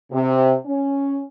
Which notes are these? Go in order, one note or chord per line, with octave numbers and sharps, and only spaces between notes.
C3
C#4